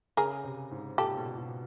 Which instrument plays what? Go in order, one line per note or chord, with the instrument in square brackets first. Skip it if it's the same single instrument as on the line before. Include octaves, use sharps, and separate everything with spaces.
[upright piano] C#3 [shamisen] G#4 A#4
[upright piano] C3
G#2
[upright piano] A#2 [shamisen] G4 A4
[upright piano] B2
B2